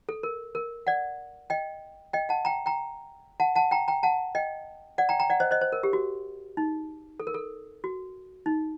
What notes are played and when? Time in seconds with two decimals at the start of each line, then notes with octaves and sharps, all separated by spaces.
0.09 A4
0.23 A#4
0.55 A#4
0.87 D5 F#5
1.50 D#5 G5
2.13 D#5 G5
2.29 F#5 A5
2.45 G5 A#5
2.66 G5 A#5
3.40 F#5 A5
3.55 F#5 A5
3.71 G5 A#5
3.88 G5 A#5
4.03 F#5 A5
4.35 D#5 G5
4.98 D5 F#5
5.09 G5 A#5
5.20 G5 A#5
5.30 D5 F#5
5.40 C5 D#5
5.51 C5 D#5
5.61 C5
5.72 A#4
5.83 G4
5.93 F#4
6.57 D#4
7.20 A4
7.27 A#4
7.34 A4
7.84 F#4
8.46 D#4